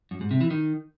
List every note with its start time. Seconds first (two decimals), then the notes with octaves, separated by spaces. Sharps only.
0.11 F#2
0.21 G#2
0.31 C3
0.41 E3
0.50 D#3